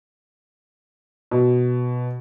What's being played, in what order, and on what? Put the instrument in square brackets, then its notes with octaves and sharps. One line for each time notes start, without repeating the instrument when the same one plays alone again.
[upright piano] B2